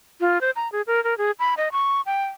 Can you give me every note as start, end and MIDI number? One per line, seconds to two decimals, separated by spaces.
0.21 0.41 65
0.41 0.51 72
0.56 0.70 82
0.72 0.82 68
0.87 1.03 70
1.04 1.17 70
1.18 1.31 68
1.39 1.54 83
1.57 1.68 75
1.72 2.01 85
2.06 2.25 79